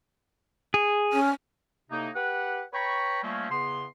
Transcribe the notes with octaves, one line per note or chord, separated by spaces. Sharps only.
G#4
C#4
A2 C3 A#3 D#4
G4 B4 F#5
B4 C#5 G5 A#5 B5 C#6
F3 G3 A3 A#3 C4 C#4
E2 C#3 B3 C6